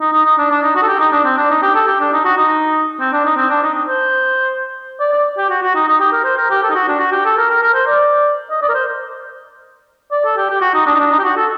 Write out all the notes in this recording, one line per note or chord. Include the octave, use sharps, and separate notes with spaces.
D#4
D#4
D#4
D4
D4
D#4
F#4
A4
G4
D#4
D4
C4
D4
D#4
G4
A4
G4
D4
D#4
F#4
D#4
C4
D4
D#4
C4
D4
D#4
C5
D5
D5
G4
F#4
F#4
D#4
D#4
G4
A#4
C5
A#4
G4
A4
D#4
F#4
D4
F#4
G4
A4
A#4
A#4
A#4
C5
D5
D#5
D5
A#4
C5
D5
A4
G4
G4
F#4
D#4
D4
D#4
D4
D#4
G4
F#4
A4